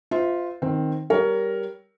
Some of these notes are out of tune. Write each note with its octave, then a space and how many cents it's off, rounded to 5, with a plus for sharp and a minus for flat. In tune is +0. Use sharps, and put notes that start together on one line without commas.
F4 +0 C5 -30 E5 -30
D#3 +0 C4 +10
G3 +0 A#4 +0 C#5 +20